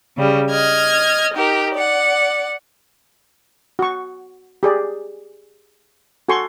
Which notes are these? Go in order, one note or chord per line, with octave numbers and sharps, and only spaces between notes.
C#3 G3
D#5 F6 G#6
D#4 G4 A#4
D5 F#5
F#4 C#6
G4 G#4 D5
F#4 A4 G#5 C6 C#6